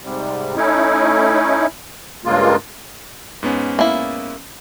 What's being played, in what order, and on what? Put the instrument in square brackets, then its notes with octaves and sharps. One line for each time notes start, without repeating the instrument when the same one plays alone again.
[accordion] G#2 C3 G3
A3 C#4 D#4 E4
G2 C#3 G#3 A#3 F4
[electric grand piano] G#2 B3 C#4
[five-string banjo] A#3 E4